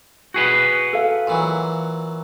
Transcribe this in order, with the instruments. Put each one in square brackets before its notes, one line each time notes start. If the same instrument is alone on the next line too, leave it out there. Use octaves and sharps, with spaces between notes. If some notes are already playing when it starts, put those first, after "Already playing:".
[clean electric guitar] F#4 G#4 B4
[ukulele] A4 F5
[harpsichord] A#2 E3 F#3